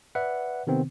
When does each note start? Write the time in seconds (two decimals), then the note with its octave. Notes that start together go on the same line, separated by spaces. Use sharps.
0.15 B4 D5 E5 F#5
0.67 C3 D#3 B3 C4